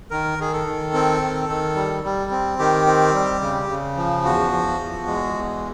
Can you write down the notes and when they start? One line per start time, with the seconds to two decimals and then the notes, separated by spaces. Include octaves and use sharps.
0.10 D#3 A#4
0.39 D#3 G#4
0.53 A4
0.67 D#3
0.94 C4
1.21 D#3
1.49 D#3
1.76 G3
2.04 G3
2.31 C4
2.59 D#3 G4
2.86 C4
3.14 G3
3.41 C#3
3.69 C#3
3.97 F3
4.24 E2 F#4
4.52 F3
4.79 E2
5.07 G#3
5.34 E2